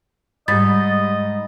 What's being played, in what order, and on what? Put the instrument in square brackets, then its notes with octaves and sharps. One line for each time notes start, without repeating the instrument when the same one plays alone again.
[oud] G#2 [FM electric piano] G3 B5 [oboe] D#5 [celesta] A6